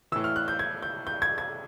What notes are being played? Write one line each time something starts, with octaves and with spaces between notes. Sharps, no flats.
A2 E3 E6
F6
F#6
G6
G#6
G6
G6
G#6
G#6